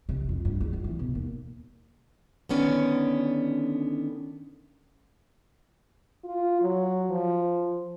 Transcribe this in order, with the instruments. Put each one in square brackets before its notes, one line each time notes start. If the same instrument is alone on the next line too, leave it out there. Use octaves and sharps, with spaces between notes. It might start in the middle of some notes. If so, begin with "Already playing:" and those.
[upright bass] C3
F2
G2
E2
F3
E3
B2
D#2
[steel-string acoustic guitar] D3 D#3 B3 C#4 D5
[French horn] F4
F#3
F3